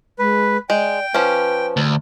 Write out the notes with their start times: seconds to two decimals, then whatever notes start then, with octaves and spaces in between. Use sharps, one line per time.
0.19 G#3 B4
0.70 G#3 D5 G5
1.14 F3 C#4 B4
1.77 D2